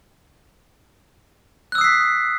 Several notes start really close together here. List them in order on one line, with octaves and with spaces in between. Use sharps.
F#6 E6 D#6 C7 B6